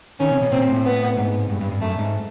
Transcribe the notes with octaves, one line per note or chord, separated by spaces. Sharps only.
D#3 C#4
C3
B2
A#2 C4
A2
B3
G#2
G2
G2
G2
F#2 A3
G#2